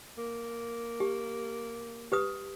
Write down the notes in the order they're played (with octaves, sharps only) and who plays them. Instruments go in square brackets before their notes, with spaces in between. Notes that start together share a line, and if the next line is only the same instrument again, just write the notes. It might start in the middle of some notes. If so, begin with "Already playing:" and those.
[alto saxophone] A#3
[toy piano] G4
G4 B4 D#6